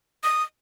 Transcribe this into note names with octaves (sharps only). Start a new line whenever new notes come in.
D#6